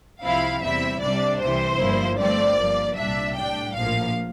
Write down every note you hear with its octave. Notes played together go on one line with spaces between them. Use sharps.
C2 C3 F3 C4 E4 F5
E2 C3 G3 C4 E4 E5
C2 C3 G3 D4 D5
C2 C3 E3 C5
G1 G2 F3 A#3 E4
G2 F3 A3 C4 D5
G1 G2 F3 A#3
C2 A#2 G3 D4 E5
A2 G3 D4 G5
A#1 A2 F3 A#3 F5